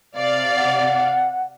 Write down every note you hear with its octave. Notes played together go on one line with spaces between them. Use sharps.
C3 D5 F5
F#5